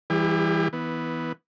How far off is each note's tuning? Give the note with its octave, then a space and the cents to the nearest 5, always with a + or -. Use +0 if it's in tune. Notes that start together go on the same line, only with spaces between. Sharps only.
E3 +0 G3 +5 G#4 -45
E3 -20 B3 +0